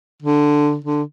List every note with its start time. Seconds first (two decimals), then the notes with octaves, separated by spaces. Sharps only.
0.22 D3
0.84 D3